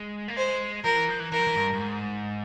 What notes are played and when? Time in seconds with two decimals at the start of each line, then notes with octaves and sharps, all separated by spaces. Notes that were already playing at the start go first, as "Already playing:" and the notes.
Already playing: G#3
0.28 A#3
0.36 G#3 C5
0.84 F3 A#4
0.96 E3
1.09 F3
1.20 E3
1.32 E3 A#4
1.39 F3
1.47 E3
1.56 G2
1.74 G2
1.80 G#2